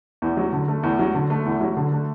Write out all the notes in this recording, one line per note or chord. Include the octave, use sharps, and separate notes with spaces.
E2
F#3
D3
A3
E2
F#3
D3
A3
E2
F#3
D3
A3